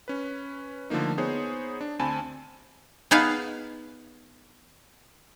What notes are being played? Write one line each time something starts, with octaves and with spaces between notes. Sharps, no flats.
C#4 B4
D3 F3 A3 A#3 D#4
B3 D#4 G#4 C5 C#5
D4
D2 C4 G#5 A5 B5
B3 D#4 G#4 B4 F5